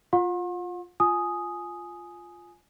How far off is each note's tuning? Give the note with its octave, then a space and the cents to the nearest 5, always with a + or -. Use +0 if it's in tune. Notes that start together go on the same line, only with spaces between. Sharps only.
F4 +10 F#5 -45 C6 +45
F4 +5 G#5 +10 D#6 +0